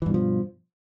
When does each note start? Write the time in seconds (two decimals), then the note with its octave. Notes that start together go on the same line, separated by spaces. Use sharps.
0.02 E3
0.06 G2
0.10 B2
0.14 F3